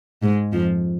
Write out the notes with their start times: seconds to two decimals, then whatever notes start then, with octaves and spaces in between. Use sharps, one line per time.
0.22 G#2 G#3
0.53 F2 F3